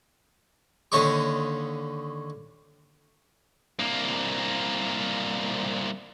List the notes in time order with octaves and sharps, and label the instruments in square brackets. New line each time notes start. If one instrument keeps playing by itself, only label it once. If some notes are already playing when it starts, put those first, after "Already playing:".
[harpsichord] D#2 D3 C#4 D#5 C#6 D6
[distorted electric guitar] C2 A#3